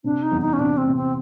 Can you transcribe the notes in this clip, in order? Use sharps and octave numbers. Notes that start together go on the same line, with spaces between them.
C3 D4
D#4
E2
D#4
C#4
C3 D4
C4
C3
C4